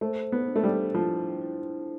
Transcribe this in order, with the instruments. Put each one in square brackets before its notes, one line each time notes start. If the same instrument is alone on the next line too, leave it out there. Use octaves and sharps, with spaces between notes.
[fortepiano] A3 [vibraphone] C5
[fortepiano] B3
[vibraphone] D4
[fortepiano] A3
G3
[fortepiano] F3 [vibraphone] E4
[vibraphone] E4